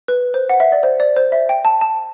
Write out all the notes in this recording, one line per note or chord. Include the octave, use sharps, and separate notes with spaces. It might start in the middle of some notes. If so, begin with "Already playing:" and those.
B4
C5
F#5
E5
D5
C5
D5
C5
E5
G5
A5
A5